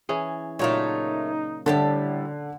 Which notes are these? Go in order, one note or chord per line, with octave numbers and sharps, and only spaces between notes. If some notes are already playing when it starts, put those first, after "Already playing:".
E3 C#4 G#4
A#2 C#3 F#3 A3 D#4 A#4 C#5
A2 D3 G3 G4 A5